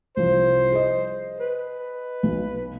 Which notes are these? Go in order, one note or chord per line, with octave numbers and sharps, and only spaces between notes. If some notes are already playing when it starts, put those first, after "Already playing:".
C2 F3 C5
G#4 D#5
B4
B1